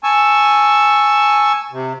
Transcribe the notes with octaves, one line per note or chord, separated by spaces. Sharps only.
G#5 A5 C#6 E6
C3